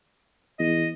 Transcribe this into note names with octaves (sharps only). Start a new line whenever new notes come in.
E2 D#5